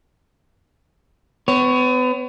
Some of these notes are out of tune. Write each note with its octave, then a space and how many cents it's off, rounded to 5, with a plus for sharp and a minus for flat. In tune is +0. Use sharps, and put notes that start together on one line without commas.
B3 +35 C#5 +0